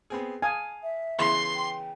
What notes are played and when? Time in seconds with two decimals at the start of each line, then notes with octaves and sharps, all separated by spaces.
0.10 B3 C4 G#4
0.42 F5 G#5 A5 D#6
0.83 E5
1.19 C#3 E3 B3 C6
1.55 G5